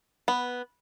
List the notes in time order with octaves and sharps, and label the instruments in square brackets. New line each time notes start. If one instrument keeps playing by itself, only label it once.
[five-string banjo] B3